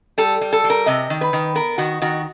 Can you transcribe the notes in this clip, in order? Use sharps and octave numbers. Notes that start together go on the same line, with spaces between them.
G3 A4
G3
A4
G3
A#4
C3 D#5
D#3
B4
D#3
B3 A#4
D#3 F#4
D#3 F#4